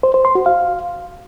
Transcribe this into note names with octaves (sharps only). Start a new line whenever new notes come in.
C5
C5
C6
F#4
F5